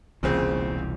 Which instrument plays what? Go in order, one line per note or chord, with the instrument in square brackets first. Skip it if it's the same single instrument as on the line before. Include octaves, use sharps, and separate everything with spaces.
[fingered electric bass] E1 C2 E3 [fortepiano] A#2 C#3 C4